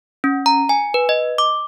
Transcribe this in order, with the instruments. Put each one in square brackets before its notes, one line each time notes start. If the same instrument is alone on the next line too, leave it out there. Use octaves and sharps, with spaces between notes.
[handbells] C#4
A#5
G#5
B4
D#5
D6